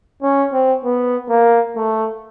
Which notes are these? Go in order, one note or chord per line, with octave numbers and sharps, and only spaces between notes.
C#4
C4
B3
A#3
A3